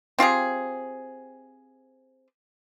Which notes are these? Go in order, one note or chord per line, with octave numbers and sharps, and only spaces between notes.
C4 F4 G4 G#4